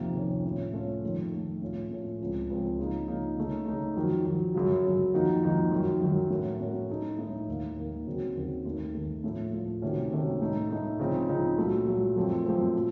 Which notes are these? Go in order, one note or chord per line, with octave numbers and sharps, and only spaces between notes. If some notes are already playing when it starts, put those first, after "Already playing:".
Already playing: F2 C3 D#3 A#3
F2 C3 D#3 A#3 C#4
A2 A3 C#4 F4
A2 A3 C#4 F4
F2 D#3 A3
F2 D#3 A3
A2 A3 C#4 F4
A2 A3 C#4 F4
C#2 C#3 F3 C4
C#2 C#3 F3 C4
C#3 F3 A#3 D#4
C#3 F3 A#3 D#4
C#3 A3 D#4
C#3 A3 D#4
F2 D#3 F#3
F2 D#3 F#3
F#2 C#3 F#3
F#2 C#3 F#3
F2 D#3 A#3 D#4 F#4
F2 D#3 A#3 D#4 F#4
F#2 D#3 F#3
F#2 D#3 F#3
A2 A3 C#4 F#4 A#4
A2 A3 C#4 F#4 A#4
A2 A3 D#4 A4
A2 A3 D#4 A4
D#2 D#3 A#3
D#2 D#3 A#3
D#2 C#3 F#3 C4 F#4
D#2 C#3 F#3 C4 F#4
D#2 D#3 A3
D#2 D#3 A3
A2 F3 A3
A2 F3 A3
C3 D#3 A3 C#4 F#4
C3 D#3 A3 C#4 F#4
A2 A3 D#4
A2 A3 D#4
C#3 F3 C4 D#4
C#3 F3 C4 D#4
A#2 F#3 A3
A#2 F#3 A3
F#2 F3 A3 C4
F#2 F3 A3 C4
A#2